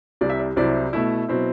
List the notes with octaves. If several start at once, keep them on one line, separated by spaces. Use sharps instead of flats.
C2 C3 G3 D5
E5
D5
C2 C3 F#3 C4 E4 D5
B2 A3 E4
B2 F#3 C4 E4